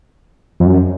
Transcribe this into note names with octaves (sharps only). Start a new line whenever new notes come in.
F2
F#2